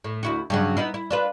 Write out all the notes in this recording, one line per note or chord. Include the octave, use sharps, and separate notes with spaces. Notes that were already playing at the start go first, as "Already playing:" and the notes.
A2
D2 E4 F#4
G2 C#3 F#3
B3 D#4 E4
E4
D4 F4 B4